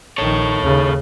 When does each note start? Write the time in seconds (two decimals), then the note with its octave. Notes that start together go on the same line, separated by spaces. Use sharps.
0.18 A#1 D#3 A4 C#5
0.60 D#2 C#3